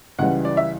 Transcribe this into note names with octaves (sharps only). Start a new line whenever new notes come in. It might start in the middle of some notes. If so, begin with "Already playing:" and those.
C#2 C#3 E3 G3 F#5
D5
E5